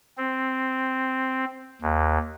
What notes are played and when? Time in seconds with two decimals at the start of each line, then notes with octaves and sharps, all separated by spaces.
0.17 C4
1.82 D#2